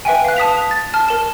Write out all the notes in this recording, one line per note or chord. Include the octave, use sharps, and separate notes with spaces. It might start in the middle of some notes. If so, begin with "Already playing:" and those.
B4 E5 G5 G#5
F5 F#6
A5 D#6 B6 F7
A6
A5 F6
A#4 E7